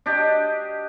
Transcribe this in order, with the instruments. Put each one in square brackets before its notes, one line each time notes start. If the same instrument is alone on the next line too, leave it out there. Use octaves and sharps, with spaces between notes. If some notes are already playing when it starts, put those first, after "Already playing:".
[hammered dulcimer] D4 G4 D#5